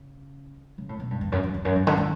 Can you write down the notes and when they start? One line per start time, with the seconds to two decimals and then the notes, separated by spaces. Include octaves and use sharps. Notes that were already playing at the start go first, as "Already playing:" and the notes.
Already playing: C#3
0.78 C#3
0.89 A2
1.00 B2
1.11 G2
1.21 E2
1.32 F#2
1.43 F#2
1.54 E2
1.65 F#2
1.76 G2
1.87 D3
1.98 E3